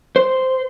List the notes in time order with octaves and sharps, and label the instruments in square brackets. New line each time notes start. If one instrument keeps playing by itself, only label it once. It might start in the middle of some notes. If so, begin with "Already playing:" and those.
[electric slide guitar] C5